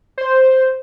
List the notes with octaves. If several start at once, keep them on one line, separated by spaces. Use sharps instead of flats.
C5